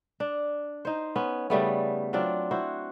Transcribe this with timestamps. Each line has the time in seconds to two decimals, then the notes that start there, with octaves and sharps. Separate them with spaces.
0.20 D4
0.85 D#4 C5
1.16 B3 C#4
1.50 C#3 G3 A3 B3
2.13 F#3 C4 D4 F4
2.51 E4 F#4 C5